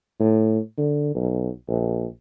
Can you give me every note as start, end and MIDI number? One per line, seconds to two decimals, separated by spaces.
0.20 0.58 45
0.77 1.12 50
1.14 1.49 35
1.68 2.06 34